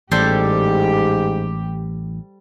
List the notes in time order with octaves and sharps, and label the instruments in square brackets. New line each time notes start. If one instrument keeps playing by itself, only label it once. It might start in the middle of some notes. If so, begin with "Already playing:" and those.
[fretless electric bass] A1 [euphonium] G#2 [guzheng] G3 A4 C5 [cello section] G4